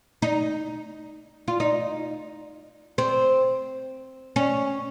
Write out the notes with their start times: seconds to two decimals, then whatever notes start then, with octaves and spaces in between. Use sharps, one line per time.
0.22 D#4
1.48 F4
1.60 D#4
2.98 C4
4.36 C#4